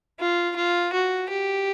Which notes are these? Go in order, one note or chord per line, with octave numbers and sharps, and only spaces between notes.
F4
F4
F#4
G4